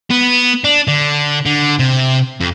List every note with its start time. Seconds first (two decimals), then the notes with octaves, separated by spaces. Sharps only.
0.11 B3
0.64 D4
0.88 D3
1.46 D3
1.79 C3
2.40 F2